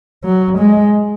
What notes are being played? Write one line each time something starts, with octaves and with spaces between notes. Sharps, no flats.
F#3
G#3